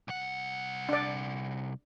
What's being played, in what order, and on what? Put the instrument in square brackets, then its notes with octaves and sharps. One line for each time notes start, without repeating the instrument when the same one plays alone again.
[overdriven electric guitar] C2 F#5
[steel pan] D4 D5